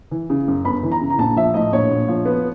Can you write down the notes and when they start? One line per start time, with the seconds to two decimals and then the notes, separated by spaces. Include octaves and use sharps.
0.11 E3
0.30 C#3
0.48 F#2
0.65 G1 B5
0.83 E3
0.92 A#5
1.01 C#3
1.10 A#5
1.18 A#1 A5
1.36 F3 E5
1.54 A2 D#5
1.72 A#1 C#5
1.91 A#1
2.08 F3
2.25 B3